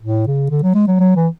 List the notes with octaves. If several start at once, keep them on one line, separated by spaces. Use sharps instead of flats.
A2
C#3
D3
F#3
G#3
F#3
F#3
E3